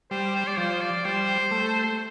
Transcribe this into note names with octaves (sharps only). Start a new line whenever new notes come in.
G3 C5
C5
D5
F3 C5
D5
G3 C5
A3